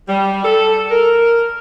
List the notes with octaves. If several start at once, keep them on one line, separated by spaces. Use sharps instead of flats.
G3
A4
A#4